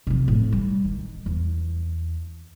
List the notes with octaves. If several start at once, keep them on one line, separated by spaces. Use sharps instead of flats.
C3 F3
A2
G3
D#3
E2